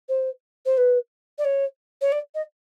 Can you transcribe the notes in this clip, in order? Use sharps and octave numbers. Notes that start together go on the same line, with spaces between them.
C5
C5
B4
D5
C#5
C#5
D5
D#5